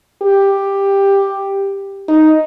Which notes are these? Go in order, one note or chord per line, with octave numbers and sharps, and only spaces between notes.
G4
D#4